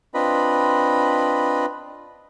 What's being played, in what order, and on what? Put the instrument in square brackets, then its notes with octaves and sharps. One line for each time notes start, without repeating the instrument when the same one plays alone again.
[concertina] C4 D4 F4 B4 D#5 B5